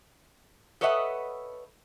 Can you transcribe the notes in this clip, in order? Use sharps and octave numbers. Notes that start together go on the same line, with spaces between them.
A4 B4 C#5 D#5 E5 F#5